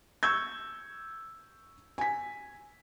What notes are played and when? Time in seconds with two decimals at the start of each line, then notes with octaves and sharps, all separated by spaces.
0.23 C#6 E6 G6 G#6
1.98 G#5 B6